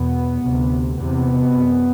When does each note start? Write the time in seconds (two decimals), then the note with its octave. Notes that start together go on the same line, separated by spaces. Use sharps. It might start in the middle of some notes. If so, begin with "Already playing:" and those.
Already playing: E2 B2 B3
0.44 D2 C3
0.97 E2 C3 B3
1.50 F#2